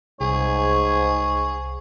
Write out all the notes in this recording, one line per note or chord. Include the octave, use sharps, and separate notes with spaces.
C2 G#2 G#4 C#5